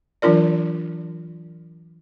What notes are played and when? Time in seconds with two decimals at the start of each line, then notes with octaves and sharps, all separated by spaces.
0.22 E3 F#3 D4 F4 A#4 D5